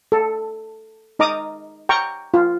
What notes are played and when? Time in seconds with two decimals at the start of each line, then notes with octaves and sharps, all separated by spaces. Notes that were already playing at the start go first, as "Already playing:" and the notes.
0.12 A4
1.19 D#4 D#5 A#5 D6 D#6
1.89 G5 A#5 C#6
2.34 F4